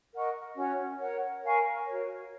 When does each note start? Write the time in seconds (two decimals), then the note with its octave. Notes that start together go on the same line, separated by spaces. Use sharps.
0.13 A#4 D#5 F#5 C#6
0.57 C#4 F#4 C#5 F#5
1.00 A#4 C#5 F#5
1.43 A#4 F5 G#5 C#6
1.87 F#4 A#4 C#5